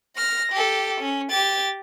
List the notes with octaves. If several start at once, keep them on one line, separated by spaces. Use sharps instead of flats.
F6 A#6
G4 A4
C#4
G4 A6